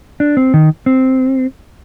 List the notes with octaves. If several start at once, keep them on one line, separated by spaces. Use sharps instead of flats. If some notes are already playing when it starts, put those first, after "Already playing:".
D4
C4
D#3
C4